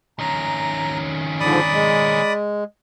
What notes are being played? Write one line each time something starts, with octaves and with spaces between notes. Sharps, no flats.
D#3 C#4 A#5
G#2 D3 F3 D5 B5 D#6
G#3